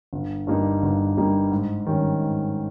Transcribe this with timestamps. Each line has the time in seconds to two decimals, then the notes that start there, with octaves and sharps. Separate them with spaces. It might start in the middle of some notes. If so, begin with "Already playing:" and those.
0.13 G1
0.47 G2 G3 A#3 D#4
0.82 G1
1.17 G2 G3 A#3 D#4
1.51 G#2
1.86 D#3 G3 C#4
2.21 G#2